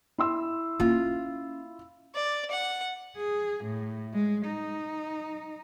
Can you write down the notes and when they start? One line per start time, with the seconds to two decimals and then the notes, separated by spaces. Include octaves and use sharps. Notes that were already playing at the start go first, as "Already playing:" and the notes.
0.18 E4 C6 E6
0.80 A#3 C#4 F4
2.15 D5
2.51 F#5
3.17 G#4
3.65 A2
4.13 G#3
4.46 D#4